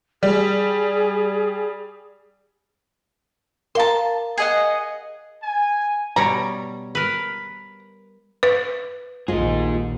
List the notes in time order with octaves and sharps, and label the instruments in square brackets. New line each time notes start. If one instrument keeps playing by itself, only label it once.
[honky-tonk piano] G3 [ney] G#4
[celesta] A#4 F5 A#5 [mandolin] A5 C6
[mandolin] G#4 D#5 F#5
[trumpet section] G#5
[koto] B2 G3 C#5 [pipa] A#5
[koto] A#4 B4
[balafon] B4
[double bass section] A#1 D#2 [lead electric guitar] D#4 G#4 [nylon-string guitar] F4 D#5